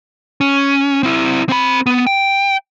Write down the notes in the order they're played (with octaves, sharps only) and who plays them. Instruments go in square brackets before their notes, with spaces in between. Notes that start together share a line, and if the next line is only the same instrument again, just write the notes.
[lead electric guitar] C#4
C4 E4
C4 B5
B3
G5